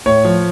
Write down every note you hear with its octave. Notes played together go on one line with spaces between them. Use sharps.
A2 C#5
F3